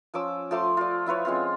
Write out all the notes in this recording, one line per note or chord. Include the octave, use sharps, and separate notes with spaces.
F3 C#4 D6 E6
F3 A3 C6 D6
F4 D5
F3 E4 B4 C#5
G#3 C4 C#4 F4